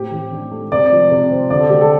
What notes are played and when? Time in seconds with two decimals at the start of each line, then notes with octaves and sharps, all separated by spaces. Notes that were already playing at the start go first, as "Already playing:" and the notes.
Already playing: A2 C4 G4
0.11 E3
0.32 D4
0.52 A3
0.72 C3 D5
0.92 F3
1.11 C3
1.31 C4
1.50 D3 D5
1.60 A4
1.70 A3 G4
1.81 A4